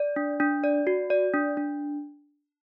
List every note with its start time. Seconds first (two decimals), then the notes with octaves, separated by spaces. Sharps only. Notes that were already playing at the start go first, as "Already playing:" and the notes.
Already playing: D5
0.16 D4
0.40 D4
0.64 D5
0.87 F#4
1.10 D5
1.34 D4
1.57 D4